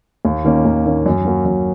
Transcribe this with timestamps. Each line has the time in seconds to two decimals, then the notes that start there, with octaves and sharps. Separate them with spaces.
0.25 D#2
0.45 D#3 A#3 C#4
0.65 D#2
0.86 D#3 A#3 C#4
1.06 F#2
1.25 F#3 A#3 F#4 A#4
1.45 F#2